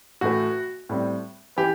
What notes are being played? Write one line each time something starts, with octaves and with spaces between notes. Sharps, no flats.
A2 E3 A3 F#4
A2 G3 C4
E3 B3 G4